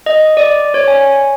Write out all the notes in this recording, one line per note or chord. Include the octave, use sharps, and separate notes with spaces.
D#5
D5
C#5
G#5